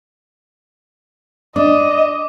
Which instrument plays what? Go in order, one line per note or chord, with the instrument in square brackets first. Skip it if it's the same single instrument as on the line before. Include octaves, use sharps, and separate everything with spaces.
[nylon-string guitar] D4 [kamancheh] D#5 [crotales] D6